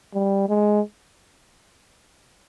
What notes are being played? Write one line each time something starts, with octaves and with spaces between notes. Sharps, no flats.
G3
G#3